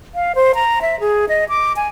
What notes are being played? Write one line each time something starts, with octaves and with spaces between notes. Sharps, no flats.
F5
C5
A#5
E5
G#4
D#5
D6
G#5